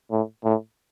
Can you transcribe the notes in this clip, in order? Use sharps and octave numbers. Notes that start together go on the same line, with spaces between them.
A2
A2